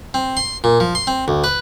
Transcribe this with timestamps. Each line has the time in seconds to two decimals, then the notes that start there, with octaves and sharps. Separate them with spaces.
0.14 C4
0.37 C6
0.64 A#2
0.80 F3
0.95 C6
1.07 C4
1.28 D2
1.44 B4